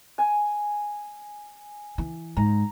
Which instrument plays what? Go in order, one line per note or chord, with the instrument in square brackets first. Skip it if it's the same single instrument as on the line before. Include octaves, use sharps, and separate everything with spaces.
[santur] G#5
[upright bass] E3
[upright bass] G#2 [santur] A#5